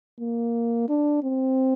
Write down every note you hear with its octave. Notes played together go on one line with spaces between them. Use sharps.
A#3
D4
C4